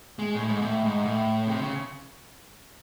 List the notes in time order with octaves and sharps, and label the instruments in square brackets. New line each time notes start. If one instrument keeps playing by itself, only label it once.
[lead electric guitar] G#3
A2
G#2
A2
G#2
A2
C3
C#3